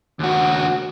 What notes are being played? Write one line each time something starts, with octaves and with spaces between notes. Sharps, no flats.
D#2 F#4